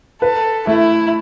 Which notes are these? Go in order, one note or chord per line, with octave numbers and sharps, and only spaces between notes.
A4 B4
A3 E4